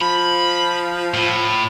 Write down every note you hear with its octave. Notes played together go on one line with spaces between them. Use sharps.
F3 B5
A2